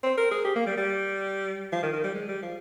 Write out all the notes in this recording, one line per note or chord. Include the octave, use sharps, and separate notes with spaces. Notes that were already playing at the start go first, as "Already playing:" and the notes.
C4
A#4
G#4
G4
A#3
G3
G3
F3
D#3
D#3
G3
G#3
G3
F3